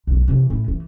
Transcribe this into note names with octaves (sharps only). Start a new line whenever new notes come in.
B1 F2
C3 E3
A2
E3